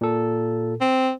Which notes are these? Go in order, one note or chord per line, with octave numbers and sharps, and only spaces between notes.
A#2 A4
C4